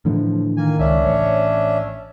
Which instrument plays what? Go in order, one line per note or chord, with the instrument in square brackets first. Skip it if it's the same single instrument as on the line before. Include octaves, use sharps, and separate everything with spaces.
[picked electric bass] A2 D3 E3 [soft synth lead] F3
[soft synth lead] D#3 [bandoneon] A#3 G#5
[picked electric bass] C#2 [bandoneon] C#4 D4 E5
[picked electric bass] A1 [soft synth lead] C#5